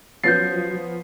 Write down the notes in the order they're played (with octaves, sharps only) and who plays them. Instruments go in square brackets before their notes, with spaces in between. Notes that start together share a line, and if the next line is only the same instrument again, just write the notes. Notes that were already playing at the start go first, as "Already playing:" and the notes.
[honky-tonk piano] F3 B3 C#4 [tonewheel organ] F#3 [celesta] G6 A6 [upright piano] C7